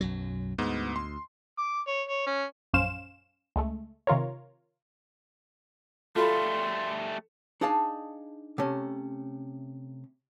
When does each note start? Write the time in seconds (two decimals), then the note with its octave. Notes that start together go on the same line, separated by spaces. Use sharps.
0.01 B1 F#2 F#3
0.58 D2 G#2 B3
0.96 C6
1.58 D6
1.87 C#5
2.09 C#5
2.27 C#4
2.73 A#1 F#2 C#4 C5 F5 E7
3.56 C#2 G#3 A3
4.07 C3 D#3 F4 A#4 C#5
6.16 G3 A3 F4 F#4 A4 F5 B5 C6
7.61 D4 D#4 G#4 F5 A5
8.58 C3 A3 C#4